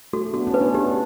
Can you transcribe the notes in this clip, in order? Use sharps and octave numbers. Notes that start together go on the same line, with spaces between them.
A3 F#4
B3 D4 F#4
C#4 E4
B4
B3 D4
B3 D4 G4